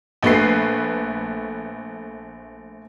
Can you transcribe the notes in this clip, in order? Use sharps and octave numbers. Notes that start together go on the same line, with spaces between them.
A#1 A3 B4 C7